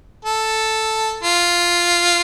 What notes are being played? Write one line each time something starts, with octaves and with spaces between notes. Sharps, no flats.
A4
F4